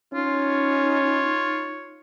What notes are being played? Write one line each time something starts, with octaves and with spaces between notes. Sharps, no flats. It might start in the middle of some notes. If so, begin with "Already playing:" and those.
C#4 D#4 F4 C#5